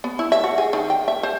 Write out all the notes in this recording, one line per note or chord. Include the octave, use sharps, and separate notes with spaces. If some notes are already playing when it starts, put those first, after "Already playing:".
B3
E4
E5
F#4
G#4
D#3
G5
E5
C5